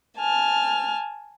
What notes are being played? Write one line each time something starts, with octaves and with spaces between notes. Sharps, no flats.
G#5 A5 F6